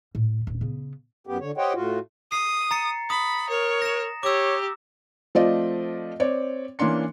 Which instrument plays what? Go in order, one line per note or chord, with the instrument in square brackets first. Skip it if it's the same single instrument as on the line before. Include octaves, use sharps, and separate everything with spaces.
[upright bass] A2
D#1
C#3 B3
[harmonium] F#2 B3 G4
D3 C#5
G4 C5 C#5 D#5 F#5 G5
A2 F4 F#4
[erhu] D#6 [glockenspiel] C7
[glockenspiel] A#5 A6 C#7
[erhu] B5 [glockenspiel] D#6
[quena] A#4 [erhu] C#5
[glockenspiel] A#6 E7
[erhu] G4 [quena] C#5 [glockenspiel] D6 E6
[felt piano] F3 A3 C4 F4 D5 D#5
C4 C#5 D5
E3 A#3 C#4 D4 C6 C#7